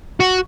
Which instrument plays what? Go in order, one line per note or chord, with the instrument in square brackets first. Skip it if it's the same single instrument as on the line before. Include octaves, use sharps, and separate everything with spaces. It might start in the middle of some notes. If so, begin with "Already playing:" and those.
[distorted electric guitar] F#4